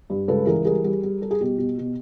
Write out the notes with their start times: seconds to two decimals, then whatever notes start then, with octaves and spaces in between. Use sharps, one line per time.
0.10 G2
0.28 C#2 A4 B4
0.47 E3 G#4 A#4
0.65 G3 G#4 A#4
0.84 G3
1.03 G3
1.21 G3 A4
1.31 G#4
1.40 B2 G4
1.58 B2
1.78 B2